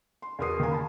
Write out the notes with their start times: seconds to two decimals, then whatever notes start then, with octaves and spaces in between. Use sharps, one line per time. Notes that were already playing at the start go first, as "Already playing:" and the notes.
0.22 C6
0.39 E2 B2 A#4 C6 D#6 C7
0.60 D#3 A#3 G#5
0.71 A5 B5